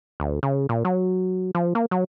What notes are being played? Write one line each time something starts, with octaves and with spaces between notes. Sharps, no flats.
D2
C#3
A#2
F#3
F3
A#3
F#3